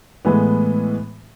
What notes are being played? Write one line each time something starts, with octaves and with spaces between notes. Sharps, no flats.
A2 E3 G#3 B3